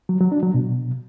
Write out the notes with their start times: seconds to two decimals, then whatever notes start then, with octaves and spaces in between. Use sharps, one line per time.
0.09 F#3
0.20 F#3
0.32 D4
0.43 F#3
0.54 B2